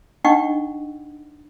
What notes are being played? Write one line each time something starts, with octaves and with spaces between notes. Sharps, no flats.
D4 D#4 D#5 F#5 G5 C#6